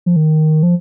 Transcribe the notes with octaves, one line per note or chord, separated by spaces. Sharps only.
F3
D#3
F3